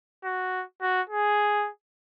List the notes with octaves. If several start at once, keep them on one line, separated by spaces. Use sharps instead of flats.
F#4
F#4
G#4